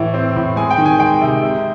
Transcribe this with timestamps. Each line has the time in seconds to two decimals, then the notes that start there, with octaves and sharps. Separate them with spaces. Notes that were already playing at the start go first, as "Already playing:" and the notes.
Already playing: A2 E3
0.14 C4
0.36 A2
0.56 G#3 G#5
0.71 G5
0.78 D#3
0.86 G#5
0.99 G#3 G5
1.21 C3
1.42 C3